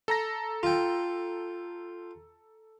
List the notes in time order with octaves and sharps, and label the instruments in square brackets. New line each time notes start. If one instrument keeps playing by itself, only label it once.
[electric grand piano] A4 A#5 A#6
[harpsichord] F4 G5